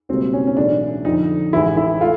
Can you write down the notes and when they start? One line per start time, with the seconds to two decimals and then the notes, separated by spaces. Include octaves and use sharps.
0.09 C#2 B2 G3 A#3 C4
0.33 C#4
0.47 C#4
0.57 B1 A2 E3 G#3 D4
1.05 F2 D3 F3 D#4
1.53 A1 A2 E3 G#3 E4
1.77 E4
2.00 A3 F4